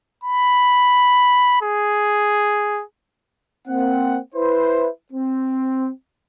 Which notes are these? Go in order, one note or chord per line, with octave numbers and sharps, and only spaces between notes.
B5
G#4
A#3 C4 F#5
E4 B4 C5
C4